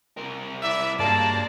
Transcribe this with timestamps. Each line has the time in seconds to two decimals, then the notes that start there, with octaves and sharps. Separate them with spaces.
0.17 C2 A#4
0.63 E4 D5 E5
0.99 G2 C#3 G#3 A#3 D5 A5